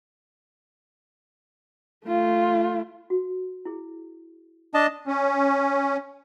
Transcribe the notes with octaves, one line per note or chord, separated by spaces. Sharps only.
A3 F4
F#4
E4 G#4
D4 D#5 A5
C#4